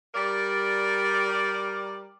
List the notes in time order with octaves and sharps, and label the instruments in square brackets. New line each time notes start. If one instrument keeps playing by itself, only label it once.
[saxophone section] G3 A#4 D5